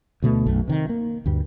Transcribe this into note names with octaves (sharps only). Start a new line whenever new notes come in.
D2 B2 G3 A3
B1 F#2 A3
C3 D#3
A#3
D2 G2 G3